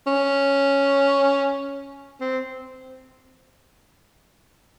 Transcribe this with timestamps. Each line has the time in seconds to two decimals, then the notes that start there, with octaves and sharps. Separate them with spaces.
0.07 C#4
2.21 C4